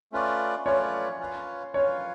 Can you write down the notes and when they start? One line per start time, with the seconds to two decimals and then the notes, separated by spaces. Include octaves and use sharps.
0.12 A3 C#4 F4 B4 D5
0.65 A3 C#4 F4 B4 C#5 D5
1.20 C#4 F4 B4 F5
1.74 C#4 F4 B4 C#5 F5